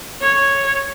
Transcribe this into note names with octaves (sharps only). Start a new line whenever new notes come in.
C#5